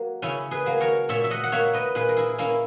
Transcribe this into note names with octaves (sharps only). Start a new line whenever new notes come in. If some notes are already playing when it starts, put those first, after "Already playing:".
Already playing: F#3 A#3
C#3 C#4 E4
G#4 B4
F#3 A#3
A#4 C#5
A#2 C#5 E5
E5
D#5 F#5
F#5
A#3 C#5 E5
B4 D#5
A#2 G#4 B4
A#4
E4 G#4
A#3 C#4 E4